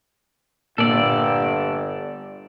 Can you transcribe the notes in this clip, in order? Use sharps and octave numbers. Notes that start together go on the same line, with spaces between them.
G1 A#2 A4 D5